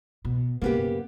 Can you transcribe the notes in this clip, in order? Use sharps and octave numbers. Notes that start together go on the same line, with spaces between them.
B2
F#2 C#3 A#3 B3 G4